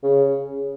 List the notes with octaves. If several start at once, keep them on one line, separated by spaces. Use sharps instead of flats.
C#3